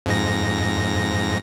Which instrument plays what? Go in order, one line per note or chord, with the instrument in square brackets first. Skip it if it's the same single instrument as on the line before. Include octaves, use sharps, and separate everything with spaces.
[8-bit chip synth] F2 G#2 A#6